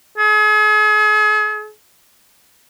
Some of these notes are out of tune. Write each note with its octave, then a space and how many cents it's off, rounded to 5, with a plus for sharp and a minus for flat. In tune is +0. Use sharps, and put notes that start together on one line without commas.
G#4 +40